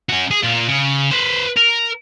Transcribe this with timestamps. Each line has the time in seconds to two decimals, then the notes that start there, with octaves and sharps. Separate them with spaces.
0.09 C#4 F#4
0.31 G#4
0.43 A#2 F4
0.68 C#3
1.11 B4 C5
1.57 A#4